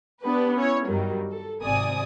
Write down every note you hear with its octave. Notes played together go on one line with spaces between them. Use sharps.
B3 D4 G4 B4
C#4 E4 C#5
G2 D#3 F#3 G3
A4
G#1 C3 D5 G#5 D#6